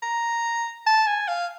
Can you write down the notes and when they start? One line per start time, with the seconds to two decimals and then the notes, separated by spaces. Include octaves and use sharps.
0.02 A#5
0.87 A5
1.07 G#5
1.28 F5